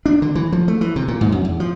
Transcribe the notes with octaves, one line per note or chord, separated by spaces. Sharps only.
D4
D3
E3
F3
A3
E3
C3
A#2
G#2
F#2
E2
F3